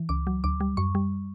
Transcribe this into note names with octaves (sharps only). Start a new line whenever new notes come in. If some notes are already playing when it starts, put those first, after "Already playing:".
Already playing: E3
C#2 D6
F#3
D2 D6
G3
F#2 C#6
G3